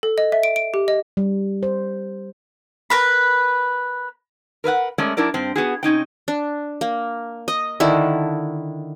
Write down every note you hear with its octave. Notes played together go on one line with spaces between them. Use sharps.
A4
D#5
E5
D7
D7
G4
D#5
G3
C5
A#4 B4 B5
A#4 B4 E5 F#5
G#3 A3 C#4 A#4 D5 E5
F#3 D4 E4 A#4 D5
G2 C4
B3 F#4 G#4
C3 C#4 D#4 G5
D4
A#3
D#5
D3 D#3 D4 E4